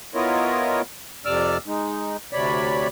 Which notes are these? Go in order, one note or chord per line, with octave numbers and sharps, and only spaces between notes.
B3 E4 F4 A#4 C#5 D#5
F2 C3 D5 D6 E6 F6
G#3 D#4
D2 C3 C#5 D5 B5